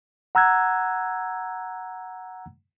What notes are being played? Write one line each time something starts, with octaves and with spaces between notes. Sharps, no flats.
F#5 A#5 E6 F#6 G#6